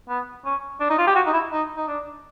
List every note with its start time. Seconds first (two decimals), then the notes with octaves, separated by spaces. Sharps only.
0.08 B3
0.45 C#4
0.80 D4
0.90 D#4
0.98 F4
1.07 G4
1.15 F#4
1.27 D#4
1.33 E4
1.52 D#4
1.76 D#4
1.88 D4